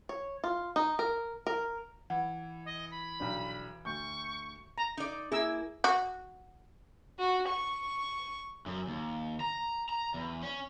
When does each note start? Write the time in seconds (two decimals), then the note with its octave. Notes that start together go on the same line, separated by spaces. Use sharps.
0.09 C#5
0.44 F4
0.76 D#4
0.99 A#4
1.47 A#4
2.10 E3 F#5
2.65 D#5
2.91 B5
3.20 B1 G3 D4
3.85 D2 C#6 G6
4.78 A#5
4.97 D#4 D5
5.32 A#3 E4 G#4 E6
5.84 F#4
7.19 F#4
7.48 C#6
8.66 F#2
8.87 D#2
9.40 A#5
9.89 A#5
10.14 E2
10.43 C#4